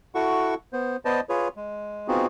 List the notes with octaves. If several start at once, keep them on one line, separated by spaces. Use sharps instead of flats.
E4 F#4 A4 F#5 C#6
B3 C5
B3 B4 C5 D5 D#5 A5
F4 G#4 B4 C#5
G#3
B3 C4 D#4 F4 F#4 G#4